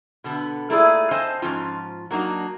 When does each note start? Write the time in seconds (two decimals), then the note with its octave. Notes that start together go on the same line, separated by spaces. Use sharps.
0.24 B2 D3 B3
0.70 A3 A#3 E4 F4 G#4 D5
1.11 C4 C5 D#5 F5 G#5 A5
1.42 G#2 F3 C#4 F4
2.11 F#3 A#3 D4 D#4 F#4